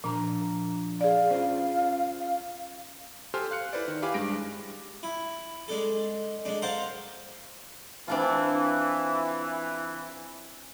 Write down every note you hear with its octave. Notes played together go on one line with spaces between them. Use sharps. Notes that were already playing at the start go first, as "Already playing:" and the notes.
A#2 F3 D4 A#5
G#4 D5 F5
C#4 F4 C5
G4 A4 C5 G#5 C6 F6
F5 F#6 C#7
E4 B4 C5 D5
D#3
E4 G4 F5 G#5 B5 D6
G2 G#3 A#6 D7
E4
G#3 D4 A4
G#3 D4
A#4 C5 F5 F#5 A5
E3 C4 D4 F4